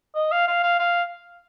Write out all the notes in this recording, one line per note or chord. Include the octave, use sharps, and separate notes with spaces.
D#5
F5
F5
F5
F5